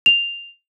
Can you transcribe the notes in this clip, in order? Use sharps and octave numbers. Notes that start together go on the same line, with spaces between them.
F7